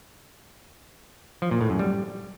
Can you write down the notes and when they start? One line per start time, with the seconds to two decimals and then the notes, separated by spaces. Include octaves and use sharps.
1.42 F3
1.51 A#2
1.61 A2
1.70 F#2
1.79 G3